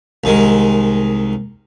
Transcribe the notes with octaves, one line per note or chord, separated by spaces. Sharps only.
C2 D#3 G#3